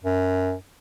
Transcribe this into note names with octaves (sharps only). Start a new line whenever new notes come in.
F#2